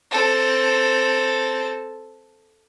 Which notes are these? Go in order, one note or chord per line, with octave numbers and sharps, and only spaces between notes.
C4 A4